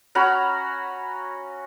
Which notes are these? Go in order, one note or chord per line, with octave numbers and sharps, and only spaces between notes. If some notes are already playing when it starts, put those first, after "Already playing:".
C#4 F#4 A#5 B5